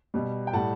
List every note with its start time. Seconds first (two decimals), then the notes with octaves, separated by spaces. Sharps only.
0.14 B2 G3
0.47 G5
0.53 A2 G3 F#5 A5